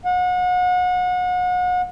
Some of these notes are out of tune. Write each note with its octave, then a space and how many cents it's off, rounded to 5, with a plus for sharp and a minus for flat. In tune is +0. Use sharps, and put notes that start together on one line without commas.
F#5 -35